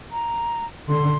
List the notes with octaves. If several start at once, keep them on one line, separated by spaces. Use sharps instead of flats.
A#5
D3 C6